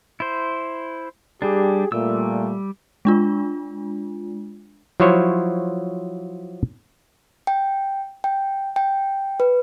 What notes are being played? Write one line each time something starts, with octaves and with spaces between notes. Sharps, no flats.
E4 C5
G3 D4 G4 G#4
A#2 G3 A3 E6
G#3 D4 F4
F3 F#3 E4 C5 C#5
G5
G5
G5
B4